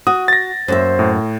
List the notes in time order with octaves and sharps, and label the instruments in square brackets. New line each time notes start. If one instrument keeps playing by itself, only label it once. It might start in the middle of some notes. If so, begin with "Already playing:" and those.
[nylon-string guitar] F#4 [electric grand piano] D#6
[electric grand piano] A6 A#6
[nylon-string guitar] F#2 A#3 E5 [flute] C5
[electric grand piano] A2